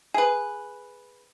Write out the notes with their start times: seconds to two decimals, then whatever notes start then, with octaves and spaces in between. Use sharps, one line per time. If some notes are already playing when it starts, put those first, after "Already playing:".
0.14 G#4 B4